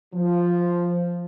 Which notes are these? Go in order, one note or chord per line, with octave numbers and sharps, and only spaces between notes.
F3